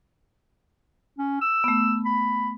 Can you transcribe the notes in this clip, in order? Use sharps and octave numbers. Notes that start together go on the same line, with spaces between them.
C#4
E6
A3 B3
B5